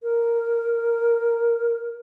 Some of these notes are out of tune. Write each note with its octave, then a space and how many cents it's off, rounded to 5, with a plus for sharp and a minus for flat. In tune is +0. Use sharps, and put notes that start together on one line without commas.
A#4 -5